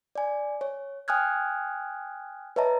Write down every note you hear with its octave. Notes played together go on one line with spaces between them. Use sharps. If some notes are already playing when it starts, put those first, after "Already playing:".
D5 G#5
C#5
G5 G#5 D#6 F6 F#6 G#6
B4 C#5 D#5 E5 A5 A#5